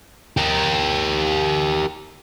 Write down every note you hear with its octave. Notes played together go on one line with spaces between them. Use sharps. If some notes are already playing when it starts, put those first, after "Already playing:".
G4 A#4